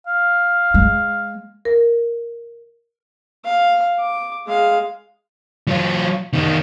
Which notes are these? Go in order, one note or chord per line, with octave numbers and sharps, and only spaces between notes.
F5
G#3
A#4
F5
D6
G#3 F5
F#3 F4
D#3 B3